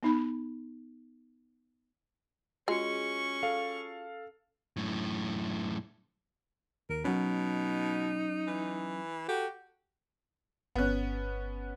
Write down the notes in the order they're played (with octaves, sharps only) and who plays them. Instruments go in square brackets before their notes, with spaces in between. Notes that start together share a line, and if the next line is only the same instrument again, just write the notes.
[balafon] B3 D#4 B5
[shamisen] G#3 [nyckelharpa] C#4 C#6 [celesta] F4 F#4 G#4
[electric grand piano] A4 F5
[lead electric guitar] F#2 A2
[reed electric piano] D#2 [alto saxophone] A#4
[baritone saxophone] B2 [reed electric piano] F#3 C#4 [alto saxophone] D#4
[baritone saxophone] E3
[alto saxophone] F#4 [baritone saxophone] G4 [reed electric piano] A4
[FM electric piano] G1 F#6 [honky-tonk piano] B3 C#4